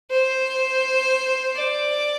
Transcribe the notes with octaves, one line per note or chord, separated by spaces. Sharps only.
C5
D5